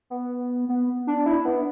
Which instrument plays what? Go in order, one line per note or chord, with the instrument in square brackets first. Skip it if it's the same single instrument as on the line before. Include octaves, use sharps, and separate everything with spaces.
[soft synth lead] B3
B3
D4
E4
B3